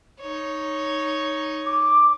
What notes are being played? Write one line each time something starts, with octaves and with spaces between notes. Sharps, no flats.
D#4 C#5
D6